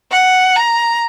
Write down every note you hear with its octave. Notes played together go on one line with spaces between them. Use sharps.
F#5
A#5